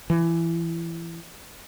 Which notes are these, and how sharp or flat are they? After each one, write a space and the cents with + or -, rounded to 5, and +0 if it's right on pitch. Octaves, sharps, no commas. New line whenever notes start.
E3 +20